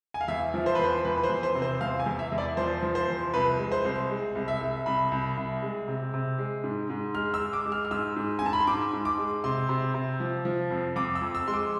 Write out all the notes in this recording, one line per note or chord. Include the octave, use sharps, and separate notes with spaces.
G#5
F5
E2 E5
F3
C5
B4
E2 C5
E2 B4
B4
C5
E2
C5
C3
C5
E2 F5
G#5
E2
E5
E2
D5
F3 C5
F3
C5
E2
C2 B4
G#3
C5
C2
G#3
C2
E5
C2
C2 B5
C2
C2
G#3
C3
C3
G#3
G#2
G#2
G#3 F6
E6
G#3
D6
G#3
F6
F6
G#2 E6
G#2
G#5
G#2 A5
B5
C6
G#2 D6
G#2
D6
G#3
C3 C6
C3
C3
F3
F3
F2
F2 D6
E6
F2
E6
G#3 C6
D6